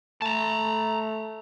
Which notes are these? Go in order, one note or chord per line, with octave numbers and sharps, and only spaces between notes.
A3 A5 A#5